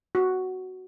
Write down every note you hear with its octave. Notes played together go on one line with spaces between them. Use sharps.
F#4